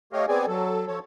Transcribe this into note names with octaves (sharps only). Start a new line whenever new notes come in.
A3 G4 C#5 D#5 F5
B3 C4 G#4 D5 G#5
F#3 A4
F3 A4 C#5